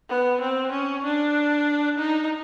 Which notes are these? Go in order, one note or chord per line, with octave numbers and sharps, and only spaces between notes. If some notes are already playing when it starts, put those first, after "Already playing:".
B3
C4
C#4
D4
D#4